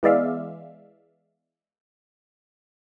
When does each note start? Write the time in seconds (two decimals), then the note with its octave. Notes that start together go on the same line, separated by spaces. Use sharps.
0.03 E3 G#3 B3 D5 E5 F5